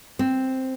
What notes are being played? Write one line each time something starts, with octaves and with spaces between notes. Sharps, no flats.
C4